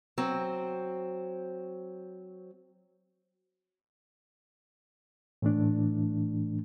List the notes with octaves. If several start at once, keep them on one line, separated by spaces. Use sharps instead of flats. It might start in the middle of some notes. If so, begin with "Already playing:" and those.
F#3 C4
A2 E3 A3 D4